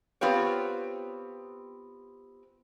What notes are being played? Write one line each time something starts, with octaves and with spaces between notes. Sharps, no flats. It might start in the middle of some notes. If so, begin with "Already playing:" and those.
B3 C4 F4 G4 C#5